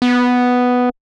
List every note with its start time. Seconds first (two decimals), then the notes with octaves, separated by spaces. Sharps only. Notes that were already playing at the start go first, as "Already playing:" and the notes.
0.02 B3